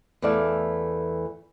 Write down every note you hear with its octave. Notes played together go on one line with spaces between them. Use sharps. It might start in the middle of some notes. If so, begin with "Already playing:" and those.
E2 E3 A3 A4 D5 F5